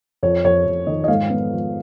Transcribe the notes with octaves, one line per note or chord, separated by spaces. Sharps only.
F2 C#5
F2 C#5
F2
D#3 D#5
D#5
G#2 F5
B3
F3